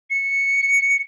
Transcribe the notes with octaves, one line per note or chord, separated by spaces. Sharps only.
C#7